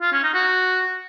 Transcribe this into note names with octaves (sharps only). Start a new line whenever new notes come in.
F4
C#4
D#4
F#4